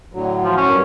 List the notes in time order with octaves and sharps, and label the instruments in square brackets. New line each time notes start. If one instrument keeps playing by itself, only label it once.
[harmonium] A2 D3 F#3
[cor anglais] F3
C#4
[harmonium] G2 A#4